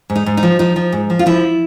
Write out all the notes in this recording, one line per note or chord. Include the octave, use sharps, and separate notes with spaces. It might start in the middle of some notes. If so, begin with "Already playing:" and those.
G#2
D#4
G#2
D#4
F3
F3 D#4
F3
G#2
F3
F4
F3 E4